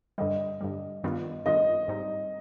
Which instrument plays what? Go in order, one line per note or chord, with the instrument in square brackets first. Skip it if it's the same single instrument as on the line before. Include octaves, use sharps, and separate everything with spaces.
[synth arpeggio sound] G2 D3 G3 [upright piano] D#5
[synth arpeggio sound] G2 D3 G3
G2 D#3 B3 D4 F4
[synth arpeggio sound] G2 D#3 B3 D4 F4 [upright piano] D#5
[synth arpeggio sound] G#2 G3 C4 D#4